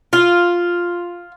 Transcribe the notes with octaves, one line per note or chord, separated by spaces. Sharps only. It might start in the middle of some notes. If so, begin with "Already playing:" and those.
F4